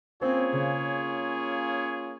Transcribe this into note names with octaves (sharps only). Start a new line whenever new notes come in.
A#3 C4 C#4 F4 G#4 C#5
C#3